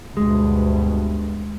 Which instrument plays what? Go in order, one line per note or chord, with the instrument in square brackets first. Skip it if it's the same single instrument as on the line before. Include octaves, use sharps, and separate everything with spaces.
[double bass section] D2 G2 B2 [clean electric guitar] G#3